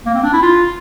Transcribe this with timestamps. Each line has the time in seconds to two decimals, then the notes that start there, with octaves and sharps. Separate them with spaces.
0.06 A#3
0.14 C4
0.23 D4
0.33 E4
0.42 F4